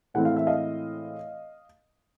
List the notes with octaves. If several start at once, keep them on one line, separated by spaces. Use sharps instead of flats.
A2 E3 G#3 C4 F#5
F5
E5
D#5 F5